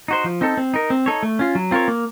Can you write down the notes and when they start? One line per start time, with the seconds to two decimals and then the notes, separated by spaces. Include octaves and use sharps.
0.08 D#4 F#4 C5
0.24 F3
0.41 C4 D#4 A4
0.57 C4
0.74 D#4 A#4
0.90 C4
1.06 D#4 A4 C#5
1.23 A3
1.39 C#4 F4
1.55 F#3
1.71 C4 F4 A#4 C#5
1.88 A#3